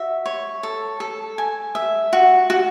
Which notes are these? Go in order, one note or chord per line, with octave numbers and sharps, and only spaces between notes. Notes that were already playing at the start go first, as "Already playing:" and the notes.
Already playing: F#4 E5
C#5
A4
A4
G#5
E5
F#4
F#4